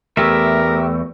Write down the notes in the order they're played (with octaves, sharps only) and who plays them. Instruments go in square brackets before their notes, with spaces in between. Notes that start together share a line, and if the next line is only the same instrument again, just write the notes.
[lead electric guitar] E2 A3 [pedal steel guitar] G4 E5 [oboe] A#4